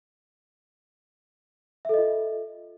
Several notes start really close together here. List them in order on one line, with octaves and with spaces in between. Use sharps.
E5 A4 D#5 F4